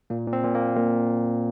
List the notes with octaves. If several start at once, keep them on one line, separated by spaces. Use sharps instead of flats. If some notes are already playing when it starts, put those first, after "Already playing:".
A#2 A#3
A#2
C4
A#2
A#2 A#3
A#2